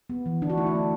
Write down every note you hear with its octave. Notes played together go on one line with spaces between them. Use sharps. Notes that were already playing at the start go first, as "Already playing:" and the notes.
B3
E3
D3 D4
F#4
A3 E4
D4
A3